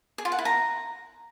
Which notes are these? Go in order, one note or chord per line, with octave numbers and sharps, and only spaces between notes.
G#4
F4
F#5
E4
A#5